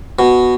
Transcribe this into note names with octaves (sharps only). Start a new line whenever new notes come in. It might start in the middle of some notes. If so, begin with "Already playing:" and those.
B2